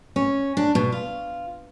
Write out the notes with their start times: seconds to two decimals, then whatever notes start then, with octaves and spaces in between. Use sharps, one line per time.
0.16 C#4
0.57 D4
0.75 B2
0.92 F4